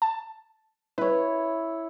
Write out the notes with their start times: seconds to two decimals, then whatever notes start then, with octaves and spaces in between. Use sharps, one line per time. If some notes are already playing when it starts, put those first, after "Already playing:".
0.02 A5
0.98 E4 B4 C#5